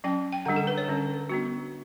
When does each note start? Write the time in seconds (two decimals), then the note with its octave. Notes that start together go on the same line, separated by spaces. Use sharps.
0.04 F#3 C#4 G5
0.32 G5
0.45 D3 G3 D4 F#5
0.56 A4
0.67 B4
0.78 C#5
0.88 D3 G3 C#4
1.29 G3 B3 D4 F#4